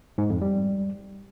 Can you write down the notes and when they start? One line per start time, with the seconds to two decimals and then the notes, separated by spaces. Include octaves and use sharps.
0.18 G#2
0.30 F2
0.42 G3